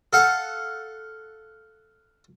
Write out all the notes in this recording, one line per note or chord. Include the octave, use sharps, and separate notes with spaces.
A4 F5 F#5